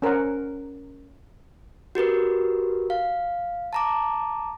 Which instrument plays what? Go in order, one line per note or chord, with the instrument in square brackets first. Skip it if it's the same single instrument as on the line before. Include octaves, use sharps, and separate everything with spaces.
[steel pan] C#4 A#4 C5 F#5
[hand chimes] F#4 G4 A#4 B4
F5
A5 A#5 D6